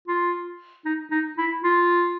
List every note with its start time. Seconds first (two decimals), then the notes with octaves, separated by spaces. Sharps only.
0.08 F4
0.85 D#4
1.11 D#4
1.38 E4
1.64 F4